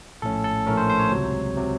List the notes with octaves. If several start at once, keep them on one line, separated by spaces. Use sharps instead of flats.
A#1 A2 A3 C#4 A4
A4
A#1 A2 A3 C#4 A#4
C5
C5
C#5
C#2 C3 F#3
C3 F#3